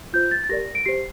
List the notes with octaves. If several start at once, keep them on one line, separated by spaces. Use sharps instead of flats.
F4 C5 G6
A6
A6
G4 A#4 D5 A#6
D7
G4 C5 C7